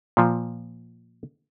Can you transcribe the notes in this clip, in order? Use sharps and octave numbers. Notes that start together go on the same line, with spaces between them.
A#2 F3